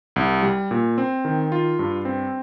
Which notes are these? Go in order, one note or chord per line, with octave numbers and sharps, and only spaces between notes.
C2
G3
A#2
C4
D#3
F4
G2
C4